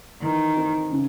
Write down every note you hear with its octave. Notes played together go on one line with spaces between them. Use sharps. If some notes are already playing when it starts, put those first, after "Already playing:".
D#3 E3
C4
C#3